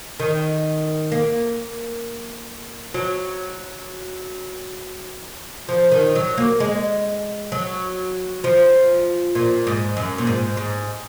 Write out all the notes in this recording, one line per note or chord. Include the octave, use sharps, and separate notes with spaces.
D#3
A#3
F#3
F3
D#3
F#3
A#3
G#3
F#3
F3
A#2
G#2
F#2
A#2
G#2
G#2